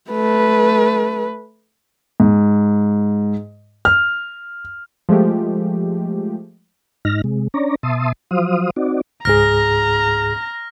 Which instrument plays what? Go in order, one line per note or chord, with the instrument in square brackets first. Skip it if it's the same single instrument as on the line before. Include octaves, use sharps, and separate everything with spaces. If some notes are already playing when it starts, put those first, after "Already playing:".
[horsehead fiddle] A3 B4
[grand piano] G#2
F6
[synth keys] F3 G#3 A3 G4
[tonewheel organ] G#2 D#4 F6 A#6
C3 G#3
C#4 D4 C#5 D5 A#5
B2 E5 A5 C6 D#6
F3 F#3 C5 F5 D#6
C4 D#4 F#4 D5
[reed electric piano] C#2 G#2 G#4 [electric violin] A#5 [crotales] F6 A#6